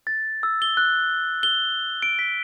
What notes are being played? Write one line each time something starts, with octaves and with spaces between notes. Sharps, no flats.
A6
E6
G7
F#6
G7
D7
B6